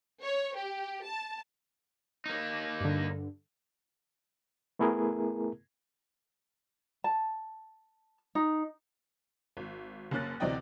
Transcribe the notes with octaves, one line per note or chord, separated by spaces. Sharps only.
C#5
G4
A5
A#3 D#4
G2 D3
A3 B3 E4 G#4 A#4
A5
D#4
G#1
F#1 A#3 C#4 F#6 A6
D2 C3 E3 D5 D#5 G5